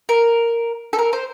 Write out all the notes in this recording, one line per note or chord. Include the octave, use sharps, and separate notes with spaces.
A#4
A4
A#4
C5